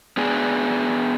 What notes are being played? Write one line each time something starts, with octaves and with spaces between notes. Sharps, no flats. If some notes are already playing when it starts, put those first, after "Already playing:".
B3 D4 G#4